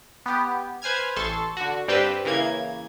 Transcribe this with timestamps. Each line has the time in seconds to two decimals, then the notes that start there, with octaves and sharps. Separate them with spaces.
0.26 B3 G4
0.82 B4 C5 G#5 F6 G#6
1.16 A1 A4 C6 C#6 A6
1.57 D3 F#4
1.88 G2 G3 C4 G4 B4 E6
2.25 C#3 E3 A#3 G#6